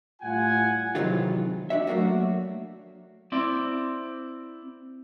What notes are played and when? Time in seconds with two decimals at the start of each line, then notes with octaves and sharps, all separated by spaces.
0.22 A2 G3 F4 F#5 G#5
0.95 C3 D#3 E3 F#3 G#3 F4
1.70 D4 F#4 E5
1.87 F#3 A3 A#3 D4 F#4
3.32 C4 E4 D5